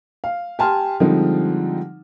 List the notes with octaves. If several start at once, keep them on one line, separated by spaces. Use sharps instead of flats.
F5
G4 G#5 A5 C6 F6
D3 F3 G3 G#3 C4 D#4